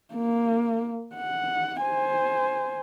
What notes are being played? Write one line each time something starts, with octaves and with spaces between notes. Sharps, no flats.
A#3
F#5
C5 G#5